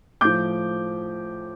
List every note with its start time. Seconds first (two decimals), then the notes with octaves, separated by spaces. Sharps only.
0.21 A2 F3 D6 G6